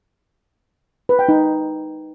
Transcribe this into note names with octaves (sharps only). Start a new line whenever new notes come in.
B4
G5
D#4